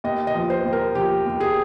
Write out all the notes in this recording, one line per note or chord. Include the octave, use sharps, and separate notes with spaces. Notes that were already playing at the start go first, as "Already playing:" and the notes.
D#2 D#5
D#5
F3
C5
D#2
A#4
F3 G4
D#2
G#4